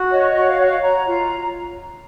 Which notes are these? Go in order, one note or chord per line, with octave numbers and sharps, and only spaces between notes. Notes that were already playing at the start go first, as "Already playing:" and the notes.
Already playing: F#4
C#5 D#5
D#5
F#4
F#5
F5
C#5 F#5
F5
C#5 A#5
F4